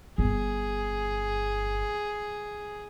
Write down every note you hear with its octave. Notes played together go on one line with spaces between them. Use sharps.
G1 G#4